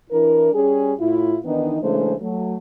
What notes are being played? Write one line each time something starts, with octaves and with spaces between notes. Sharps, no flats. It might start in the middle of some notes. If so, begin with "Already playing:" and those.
E3 D4 E4 A#4
G3 C#4 G4 G#4
A2 E4 F4
D#3 E3 B3 D4 D#4
C#3 E3 G#3 A3 D4 C5
F#3 A3